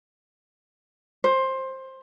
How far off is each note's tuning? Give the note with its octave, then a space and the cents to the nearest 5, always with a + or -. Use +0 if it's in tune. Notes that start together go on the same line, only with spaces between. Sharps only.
C5 +15